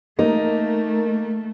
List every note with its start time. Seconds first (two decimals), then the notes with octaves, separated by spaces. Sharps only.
0.19 A3 A#3 D#4